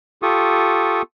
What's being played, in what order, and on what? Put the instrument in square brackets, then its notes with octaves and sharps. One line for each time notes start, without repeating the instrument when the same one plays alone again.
[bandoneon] F4 G4 A4 C#6 D#6